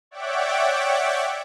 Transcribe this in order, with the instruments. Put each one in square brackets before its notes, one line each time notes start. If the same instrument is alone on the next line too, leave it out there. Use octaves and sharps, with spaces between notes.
[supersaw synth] C#5 D5 E5 F#5 G5 D6